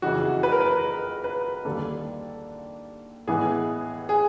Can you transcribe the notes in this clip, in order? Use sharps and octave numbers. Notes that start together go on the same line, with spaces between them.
F#1 F2 C#3 E3 F#4
B4
A#4
B4
B4
D#2 D3 G3 A#3 A4
A1 A2 E3 G#3 B3 G#4
G#4